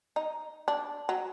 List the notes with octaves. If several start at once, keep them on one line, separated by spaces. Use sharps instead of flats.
D#4
D4
F#3